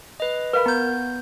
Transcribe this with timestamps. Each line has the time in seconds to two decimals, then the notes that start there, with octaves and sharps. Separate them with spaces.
0.20 B4 D#5
0.53 A#4 B4 F5 B5
0.66 B3 A#5 G6